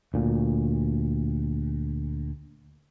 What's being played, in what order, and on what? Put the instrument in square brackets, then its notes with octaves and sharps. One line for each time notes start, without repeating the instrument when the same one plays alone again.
[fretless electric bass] D2 A#2